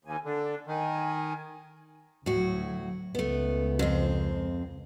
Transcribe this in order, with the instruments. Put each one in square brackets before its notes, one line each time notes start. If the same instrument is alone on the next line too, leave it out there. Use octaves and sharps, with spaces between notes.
[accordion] D#2 [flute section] G#5
[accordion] D3 [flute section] D4
[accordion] D#3 [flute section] G#5
[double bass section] D2 F#3 [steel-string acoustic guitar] A2 F#4
[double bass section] C#2 [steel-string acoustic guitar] A3 B3
[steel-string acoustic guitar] F2 C4